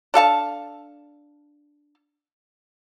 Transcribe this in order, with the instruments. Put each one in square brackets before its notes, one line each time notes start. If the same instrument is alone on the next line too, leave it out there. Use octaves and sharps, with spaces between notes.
[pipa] D4 A4 F5 A5